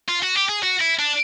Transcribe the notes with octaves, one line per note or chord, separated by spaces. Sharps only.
F4
F#4
G4
G#4
F#4
E4
D4